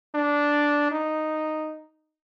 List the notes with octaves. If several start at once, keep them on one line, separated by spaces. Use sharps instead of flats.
D4
D#4